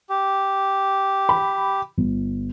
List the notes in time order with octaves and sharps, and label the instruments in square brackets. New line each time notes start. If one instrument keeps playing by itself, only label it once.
[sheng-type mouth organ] G4
[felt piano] B5
G1